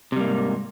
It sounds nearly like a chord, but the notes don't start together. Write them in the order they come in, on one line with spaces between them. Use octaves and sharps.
C3 G3 A#3 G#2